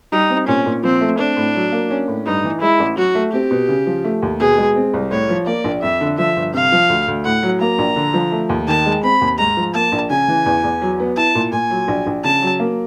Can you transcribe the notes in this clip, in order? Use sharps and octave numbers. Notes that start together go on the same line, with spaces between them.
G3 D#4
C4
A#2 C#4
A#2
F3 C4
A3
C4 D4
A2
F#3
A#3
C#4
A2
G2 D#4
E3
G#3 E4
A1
F#3 F#4
A3
C4 G4
B2
C#3
F3
A3
D#2
B2 G#4
G#3
C4
C2
A2 C#5
F3
A#3 D5
A#1
F2 E5
D3
F3 E5
G1
C3 F5
F3
D2
D2
A2 F#5
F#3
A#3 A#5
A#1
D3
F3
A3
D#2
D#3 A5
G#3
C4 B5
D#2
G#2 A#5
F3
A#3 A5
A#1
C#3 G#5
E3
E2
E2
F#3
B3
E4 A5
A#2
A#2 G#5
F#3
A#1
A#1
C#3 A5
F#3
A#3